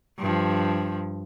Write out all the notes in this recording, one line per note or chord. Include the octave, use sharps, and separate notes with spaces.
G2 F3